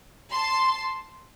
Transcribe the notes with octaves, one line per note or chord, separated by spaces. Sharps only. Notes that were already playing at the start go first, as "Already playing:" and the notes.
A5 C6